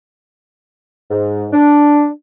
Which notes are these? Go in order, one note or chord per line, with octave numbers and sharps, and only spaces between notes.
G#2
D4